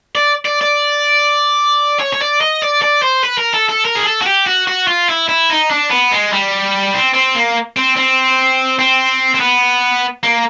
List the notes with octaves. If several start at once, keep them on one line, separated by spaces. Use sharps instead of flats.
D5
D5
D5
C#5
C#5
D5
D#5
D5
D5
C5
B4
A#4
A4
A4
A#4
G#4
A4
F#4
G4
F#4
F#4
F4
E4
E4
D#4
D4
B3
G#3
G3
C4
C4
A#3
C4
C4
C4
C4
B3
A#3